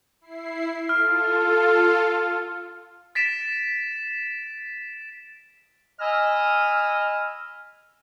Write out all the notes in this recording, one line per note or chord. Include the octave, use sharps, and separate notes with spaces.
E4 C7
F4 A4 F6
A6 B6 D7 E7
D#5 G#5 B5 E6 F6